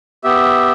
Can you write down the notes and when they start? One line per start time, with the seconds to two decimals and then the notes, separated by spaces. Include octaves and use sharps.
0.24 B3 G4 E5